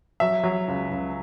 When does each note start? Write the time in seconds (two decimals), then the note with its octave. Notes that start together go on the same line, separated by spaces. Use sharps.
0.20 F#3 E5
0.43 F#3
0.68 C#2
0.91 C#2